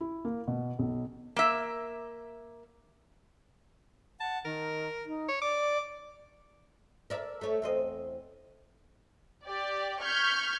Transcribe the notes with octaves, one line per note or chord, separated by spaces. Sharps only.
E4
A#3
B2
B1
A#3 E5
F#5 A5
D#3 A#4
D#4
C#5
D5 D6
A#4 D5 E5
A3 C#5
E2 C4 D#5
G4 D5
C#6 F6 G6 G#6 B6